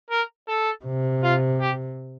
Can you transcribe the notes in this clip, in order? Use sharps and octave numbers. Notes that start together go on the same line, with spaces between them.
A#4
A4
C3
F4
G4